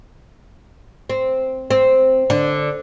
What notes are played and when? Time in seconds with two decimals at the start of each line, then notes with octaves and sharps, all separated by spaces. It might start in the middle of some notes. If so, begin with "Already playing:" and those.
1.10 C4
1.71 C4
2.30 D3